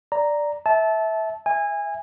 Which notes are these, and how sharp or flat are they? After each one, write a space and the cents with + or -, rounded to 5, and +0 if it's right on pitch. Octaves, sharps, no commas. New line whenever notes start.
D5 +0 A#5 +0
E5 -20 A5 -20
E5 +0 G#5 -20